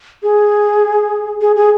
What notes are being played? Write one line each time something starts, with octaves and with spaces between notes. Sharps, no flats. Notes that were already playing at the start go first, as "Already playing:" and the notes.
G#4
G#4
G#4